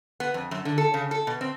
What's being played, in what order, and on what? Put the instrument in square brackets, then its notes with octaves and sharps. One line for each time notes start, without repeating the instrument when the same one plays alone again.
[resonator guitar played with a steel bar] B3
F2
F#2
D3
A4
C#3
A4
B2
C4